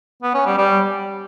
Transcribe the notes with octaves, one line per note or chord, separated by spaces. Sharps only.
B3
C#4
G3
G3